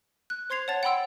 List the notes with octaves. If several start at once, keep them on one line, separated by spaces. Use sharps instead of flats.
F#6
C5 C6 G#6 C7 F7
C#5 F#5 A5 A6 F7
F#5 G5 B5 C6 E6 D7